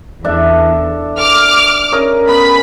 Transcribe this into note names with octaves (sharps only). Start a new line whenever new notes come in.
E2 D4 A4 E5
D6 F6
C#4 G#4 A#4
B3 B5